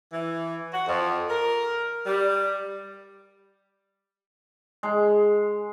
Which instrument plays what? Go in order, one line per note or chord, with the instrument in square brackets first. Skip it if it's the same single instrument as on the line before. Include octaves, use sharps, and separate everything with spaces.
[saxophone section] E3
F#4
F2
A#4
G3
[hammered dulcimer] G#3